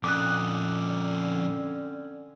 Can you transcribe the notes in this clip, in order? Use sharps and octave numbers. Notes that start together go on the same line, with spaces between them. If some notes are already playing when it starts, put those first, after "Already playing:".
F2 A#2 D3 C4 C#4 D6 D#6 F#6